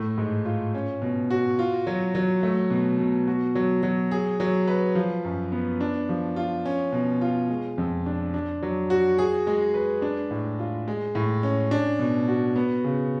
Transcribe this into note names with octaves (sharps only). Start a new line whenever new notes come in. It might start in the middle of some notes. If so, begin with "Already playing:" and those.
Already playing: A2 A3
G#2
F4
C#4
B2
F#4
F4
F#3
F#3
A3
B2
B2
F#4
F#3
F#3
G#4
F#3
B4
F3
F#2
B3
D4
F3
F4
C#4
B2
F4
G#3
F2
D4
D4
F#3
F#4
G#4
G#3
B4
D4
A2
F4
G#3
A2
C#4
D4
B2
F#4
B3
C#3